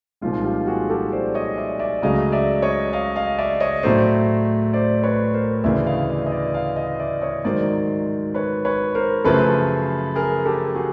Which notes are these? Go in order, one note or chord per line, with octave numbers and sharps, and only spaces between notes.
C2 A#2 F3 G#3 D#4 F4
F4 G4
F#4 G#4
G4 A4
C5 D5
C#5 D#5
D5 E5
D5 E5
C#2 C#3 F#3 A3 D#5 F5
D5 E5
C#5 D#5
D#5 F5
D#5 F5
D5 E5
C#5 D#5
A2 F#3 A3 C5 D5
C5 D5
B4 C#5
A#4 C5
D2 C#3 E3 A3 D5 E5
D#5 F5
D5 E5
D#5
D5 E5
D#5 F5
D#5 F5
D5 E5
C#5 D#5
G#2 D#3 F#3 C5 D5
B4 C#5
B4 C#5
A#4 C5
F#2 C#3 F3 A3 A4 B4
G#4 A#4
G4 A4
F#4 G#4